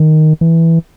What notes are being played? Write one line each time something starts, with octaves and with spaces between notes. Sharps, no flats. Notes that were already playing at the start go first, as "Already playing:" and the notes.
Already playing: D#3
E3